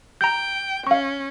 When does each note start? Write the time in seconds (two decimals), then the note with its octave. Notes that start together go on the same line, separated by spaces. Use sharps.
0.21 G5 A#5 G6
0.87 C#4 F5 C#6